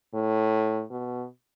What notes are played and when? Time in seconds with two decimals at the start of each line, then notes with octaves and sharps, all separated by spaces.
0.15 A2
0.90 B2